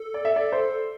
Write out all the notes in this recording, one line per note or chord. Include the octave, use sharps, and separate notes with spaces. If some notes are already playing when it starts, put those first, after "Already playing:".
Already playing: A4
D5
E5
D5
C5